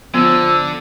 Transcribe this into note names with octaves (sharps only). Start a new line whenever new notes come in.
D3 F3 B3 E6